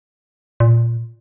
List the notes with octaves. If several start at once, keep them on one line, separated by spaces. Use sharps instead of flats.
A#2